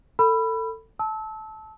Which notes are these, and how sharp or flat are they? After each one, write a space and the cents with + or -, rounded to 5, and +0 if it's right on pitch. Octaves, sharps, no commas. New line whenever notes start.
A4 +25 B5 +0 E6 +40
A5 -15 E6 -30